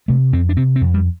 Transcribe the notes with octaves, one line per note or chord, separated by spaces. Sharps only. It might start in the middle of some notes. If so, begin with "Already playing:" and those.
C3 A3
F2 C4
D4
C3 C4
C4
F2
G3